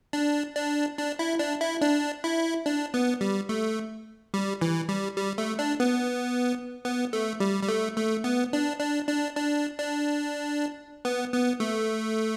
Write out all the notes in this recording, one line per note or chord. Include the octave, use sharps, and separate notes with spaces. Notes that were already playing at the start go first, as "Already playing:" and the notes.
D4
D4
D4
E4
D4
E4
D4
E4
D4
B3
G3
A3
G3
E3
G3
G3
A3
D4
B3
B3
A3
G3
G3
A3
A3
B3
D4
D4
D4
D4
D4
B3
B3
A3